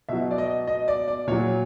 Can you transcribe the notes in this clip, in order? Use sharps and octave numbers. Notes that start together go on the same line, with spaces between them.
B2 F#3 E5
D5
D#5
D#5
D5
D5
A#2 F#3 C#5